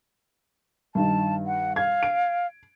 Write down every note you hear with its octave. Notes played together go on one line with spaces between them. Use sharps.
G2 D#3 A5
F#5
F5 G#6
D7